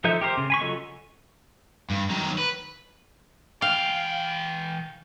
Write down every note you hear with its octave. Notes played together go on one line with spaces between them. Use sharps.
F3 D#4 A4 E5 G6
G4 A#4 C5
C#3
G#5 B5 C#6
C#3 F#3 F4 A4 D#5
G2
D#3 F#3
B4
E3 F5 G5